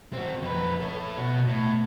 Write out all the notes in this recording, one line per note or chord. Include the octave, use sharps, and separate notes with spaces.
C4 F#4
F2 B4
A4 C#5
B2 F#4
A2